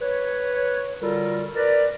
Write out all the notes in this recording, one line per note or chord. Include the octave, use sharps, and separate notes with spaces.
B4 C#5
D3 G3 F4 F#4 A4 A#4
A#4 B4 D5